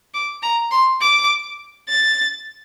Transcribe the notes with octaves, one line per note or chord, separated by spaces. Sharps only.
D6
A#5
C6
D6
A6